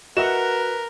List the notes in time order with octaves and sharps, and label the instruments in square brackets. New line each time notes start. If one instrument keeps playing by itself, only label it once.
[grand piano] F#4 E7 [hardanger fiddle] A#4 [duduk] B4 [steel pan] D#5 E5 F#5